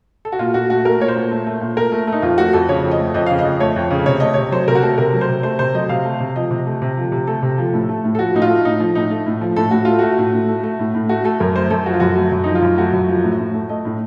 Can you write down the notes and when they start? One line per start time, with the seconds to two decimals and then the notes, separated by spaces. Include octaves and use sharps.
0.25 A4
0.32 F#4
0.39 A#2 F4
0.54 A#2 F#4
0.70 A3 F#4
0.85 A3 A#4
1.00 A#2 C#5
1.08 C5
1.16 A#2
1.31 A3
1.47 A3
1.61 A#2
1.77 A#2 A#4
1.92 A3
2.07 A3
2.12 D#4
2.22 F2 F4
2.37 A3 F#4
2.53 F2 A4
2.69 C#3 C#5
2.84 F2
2.91 D#5
2.99 A3
3.14 F2 D#5
3.26 C#3 F5
3.39 D#5
3.45 F2
3.60 A3 C#5
3.76 F2
3.91 C#3
4.06 C3 C#5
4.20 A3 D#5
4.34 C3 C#5
4.52 F#3 C5
4.68 C3 A#4
4.75 F#4
4.82 A3 A4
4.98 C3 A#4
5.13 F#3
5.21 C5
5.29 C3
5.43 A3 C5
5.59 C3 C5
5.74 F#3 D#5
5.89 C3 F5
6.05 A3
6.20 C3
6.36 F3 D#5
6.51 C3
6.66 A3
6.82 C3
6.97 F3
7.12 C3
7.27 A3 A4
7.42 C3
7.58 F3
7.73 A2
7.89 A3
8.04 A2
8.15 A4
8.19 F3 F#4
8.34 A2 D#4
8.42 F4
8.50 A3
8.65 A2 D#4
8.80 F3
8.95 A2 D#4
9.11 A3
9.26 A2
9.41 F3
9.56 A2 A4
9.71 A2 F#4
9.85 A3 F4
9.99 A3 F#4
10.18 A2
10.34 A2
10.49 A3
10.64 A3
10.79 A2
10.94 A2
11.09 A3 F#4
11.24 A3 A4
11.40 F#2 A#4
11.56 A3 C5
11.70 F#2 A4
11.86 F3 F#4
11.93 F4
12.00 F#2 F#4
12.17 A3
12.32 F#2
12.44 F3 D#4
12.55 F4
12.62 F#2
12.78 A3 F#4
12.93 F#2
13.09 F3
13.24 A2
13.39 A2
13.54 A3
13.69 A3 D#5
13.85 A2